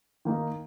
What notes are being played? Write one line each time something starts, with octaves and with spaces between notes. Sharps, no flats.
D#3 A#3 D#4